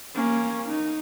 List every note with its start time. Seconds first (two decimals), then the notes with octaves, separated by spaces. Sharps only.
0.15 A#3 C#4
0.68 D#4